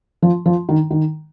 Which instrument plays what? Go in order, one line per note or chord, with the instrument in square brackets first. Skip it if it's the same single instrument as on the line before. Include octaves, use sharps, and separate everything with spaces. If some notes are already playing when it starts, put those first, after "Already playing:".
[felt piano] F3
F3
D#3
D#3